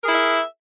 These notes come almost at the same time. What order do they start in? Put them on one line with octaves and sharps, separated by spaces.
A#4 G#4 E4 E5